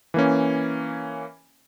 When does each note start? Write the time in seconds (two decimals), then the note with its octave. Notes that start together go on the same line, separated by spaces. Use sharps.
0.14 E3 A#3 C#4